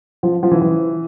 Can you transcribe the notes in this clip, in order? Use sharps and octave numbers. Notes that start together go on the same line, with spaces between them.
F3
F3
E3
E3